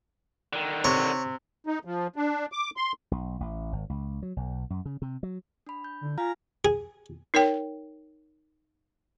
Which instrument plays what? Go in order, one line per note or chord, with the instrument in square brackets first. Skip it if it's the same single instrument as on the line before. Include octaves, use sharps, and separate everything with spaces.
[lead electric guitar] D3 D#3
[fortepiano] C3 [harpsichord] C#5
[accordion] D#4
F3
D4
D6
C6
[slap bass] B1
A1
G#1
C#2
F#3
B1
F#2
C#3
C3
F#3
[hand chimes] D4 B5
G6
[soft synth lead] D3
[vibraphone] F4 [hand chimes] F5 G#5 [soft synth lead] A#5
[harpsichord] G#4
[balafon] D#4 A#4 C#5 G5